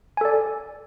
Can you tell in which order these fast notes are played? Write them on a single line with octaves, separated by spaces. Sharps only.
G#5 A4 D5